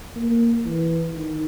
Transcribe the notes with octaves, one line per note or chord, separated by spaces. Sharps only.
A#3
E3
D#3